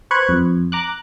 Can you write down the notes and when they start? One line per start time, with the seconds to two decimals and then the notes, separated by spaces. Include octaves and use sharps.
0.11 B4 C5 C#6 F#6 G#6
0.29 F2
0.72 A#5 D6 F#6